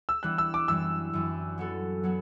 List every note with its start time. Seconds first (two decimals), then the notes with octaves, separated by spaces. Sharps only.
0.09 E6
0.23 E3 G3 B3 D4 F#6
0.38 E6
0.54 D6
0.68 F#2 E3 G3 E6
1.13 F#2 E3 G3
1.58 F#3 B3 F#4 A4
2.03 F#3 B3 F#4